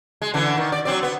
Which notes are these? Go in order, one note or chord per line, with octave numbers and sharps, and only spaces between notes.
G#3
D3 E3 D4
D#3
D5
F#3 C4 D5
B3